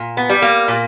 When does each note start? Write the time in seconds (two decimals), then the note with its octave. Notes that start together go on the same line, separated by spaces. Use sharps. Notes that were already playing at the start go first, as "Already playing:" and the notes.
Already playing: A#2
0.17 B3
0.30 G3
0.42 A#3
0.68 A#2